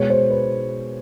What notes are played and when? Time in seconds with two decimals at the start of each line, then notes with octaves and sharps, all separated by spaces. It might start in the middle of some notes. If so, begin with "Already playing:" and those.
Already playing: B2 G#3 B3 C#5
0.10 C5
0.30 B4